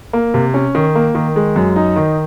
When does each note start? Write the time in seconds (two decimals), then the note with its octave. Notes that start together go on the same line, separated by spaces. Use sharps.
0.13 A#3
0.34 C3
0.54 C#4
0.75 D#3
0.95 A#3
1.15 D#3
1.36 G#3
1.56 F#2
1.76 D#4
1.96 D#3